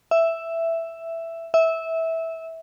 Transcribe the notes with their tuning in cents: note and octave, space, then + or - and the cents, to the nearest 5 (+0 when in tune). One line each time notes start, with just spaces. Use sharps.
E5 +5
E5 -15